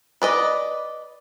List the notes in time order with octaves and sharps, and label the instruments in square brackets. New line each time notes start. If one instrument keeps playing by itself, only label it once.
[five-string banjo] B4 D5 D#5